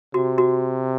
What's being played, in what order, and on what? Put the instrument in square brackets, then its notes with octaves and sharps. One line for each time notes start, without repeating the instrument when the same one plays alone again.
[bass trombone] C3 [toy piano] F#4
[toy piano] F#4